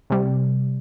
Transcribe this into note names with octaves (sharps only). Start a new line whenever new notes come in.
C3 G3